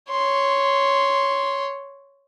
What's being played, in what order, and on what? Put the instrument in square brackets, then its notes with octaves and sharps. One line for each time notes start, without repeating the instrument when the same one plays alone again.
[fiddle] C#5 C6